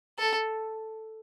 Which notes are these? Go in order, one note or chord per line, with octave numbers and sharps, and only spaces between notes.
A4